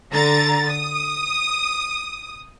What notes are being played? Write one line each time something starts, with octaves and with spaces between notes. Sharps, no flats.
D3 A#5 A6
D#6